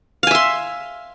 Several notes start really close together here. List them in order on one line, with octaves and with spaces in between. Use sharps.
F5 G#5 E5 C6